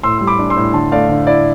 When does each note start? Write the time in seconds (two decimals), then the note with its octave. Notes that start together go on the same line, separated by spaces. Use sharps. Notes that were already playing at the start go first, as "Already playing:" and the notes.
0.03 A2 C6 E6
0.18 G3 E6
0.27 B5 D6
0.39 D4
0.50 C6 E6
0.56 A2
0.74 D3 A5 C6
0.92 A3 D5 F5
1.09 D3
1.27 E4 D5